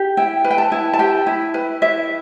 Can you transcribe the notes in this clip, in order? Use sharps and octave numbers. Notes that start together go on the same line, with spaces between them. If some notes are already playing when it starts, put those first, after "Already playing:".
Already playing: G4
E4 G5
B4
G5
A5
E4
A5
G4 G5
E4
B4
E4 E5